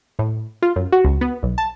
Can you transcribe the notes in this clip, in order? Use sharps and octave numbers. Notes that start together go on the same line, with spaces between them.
A2
F4
F#2
F#4
C#2
B3
B1
A5